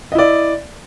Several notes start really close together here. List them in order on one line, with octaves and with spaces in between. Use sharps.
D#5 E4 D5